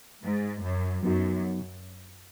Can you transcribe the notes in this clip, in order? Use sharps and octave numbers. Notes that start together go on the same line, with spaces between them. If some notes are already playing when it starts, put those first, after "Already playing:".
G#2
F#2
F#2 F#3 B3 D#4 F#4